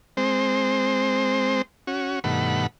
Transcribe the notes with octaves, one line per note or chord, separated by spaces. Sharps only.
G#3 C4 C5
C#4 F#4
G2 B2 D#3 A3 F#5 B5